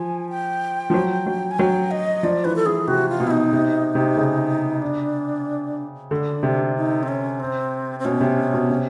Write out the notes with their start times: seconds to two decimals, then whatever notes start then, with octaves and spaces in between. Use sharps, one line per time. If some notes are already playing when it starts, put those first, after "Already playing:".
Already playing: F3 G#5
0.29 G5
0.90 F3
0.94 F#3
1.26 F#3
1.51 G#5
1.59 F#3 G5
1.91 D#5
2.23 F3 D5
2.45 E3 B4
2.56 A4
2.66 E3 G#4
2.88 C3 F#4
3.09 F4
3.20 B2
3.27 E4
3.31 D#4
3.52 C3
3.95 C3
4.17 C#3
4.82 D4
6.11 D3 D4
6.43 C3
6.76 D#4
7.03 C4
7.08 C#4
7.40 C4
7.99 C4
8.05 B2 C#4
8.21 C3
8.54 B2
8.70 C3